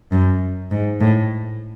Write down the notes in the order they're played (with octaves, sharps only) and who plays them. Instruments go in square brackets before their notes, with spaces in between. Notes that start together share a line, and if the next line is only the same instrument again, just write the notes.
[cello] F#2
G#2
A2